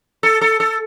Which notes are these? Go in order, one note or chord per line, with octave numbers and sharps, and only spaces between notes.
A4
A4
A4